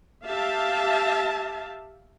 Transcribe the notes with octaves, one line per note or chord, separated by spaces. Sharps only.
G4 E5 F5 A5